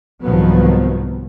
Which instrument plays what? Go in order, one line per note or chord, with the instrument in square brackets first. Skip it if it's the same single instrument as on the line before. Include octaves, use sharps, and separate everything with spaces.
[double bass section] C2 G#2 D#3 F3 F#3 B3